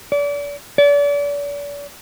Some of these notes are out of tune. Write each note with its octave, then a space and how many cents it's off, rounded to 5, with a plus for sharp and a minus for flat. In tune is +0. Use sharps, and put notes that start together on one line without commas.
D5 -35
D5 -40